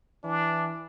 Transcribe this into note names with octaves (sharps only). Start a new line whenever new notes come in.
E3 D4